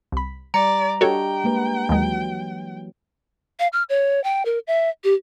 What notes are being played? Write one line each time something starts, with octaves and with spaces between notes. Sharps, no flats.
C2 B5
G3 D5 A#5 C#7
D4 F#4 G4 A4 C#5 D#5 G5
G#3 A#3 B4
D#2 E3 F#3 G#3
F5
F6
C#5
G5
A#4
E5
G4